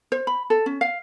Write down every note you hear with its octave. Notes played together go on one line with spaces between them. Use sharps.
C5
B5
A4
C#4
F5